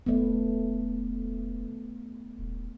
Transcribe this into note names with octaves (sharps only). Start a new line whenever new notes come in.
E1 A3 B3
D#1